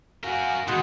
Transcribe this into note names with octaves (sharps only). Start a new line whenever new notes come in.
F#4 A#4 F5 F#5 G#5
B2 D#3 G#3 F#4